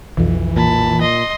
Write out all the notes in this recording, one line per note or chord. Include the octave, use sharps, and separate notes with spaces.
B1 F2 E3
A#2 A5 B5
D#5 C6